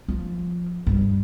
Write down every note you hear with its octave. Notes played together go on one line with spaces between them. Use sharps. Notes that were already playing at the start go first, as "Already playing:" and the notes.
F3
G2